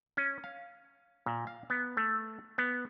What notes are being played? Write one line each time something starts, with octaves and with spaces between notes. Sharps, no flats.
C#4
F5
A#2
F5
B3
A3
B3